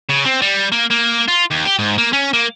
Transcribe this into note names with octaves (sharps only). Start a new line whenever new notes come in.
C#3
C4
G3
A#3
A#3
F4
D#2
G4
G#2
A#3
C#4
A#3